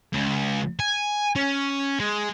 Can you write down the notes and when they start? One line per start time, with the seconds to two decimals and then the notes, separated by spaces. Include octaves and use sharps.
0.13 C#2
0.79 G#5
1.36 C#4
2.00 G#3